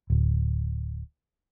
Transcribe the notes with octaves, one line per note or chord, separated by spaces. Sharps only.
D1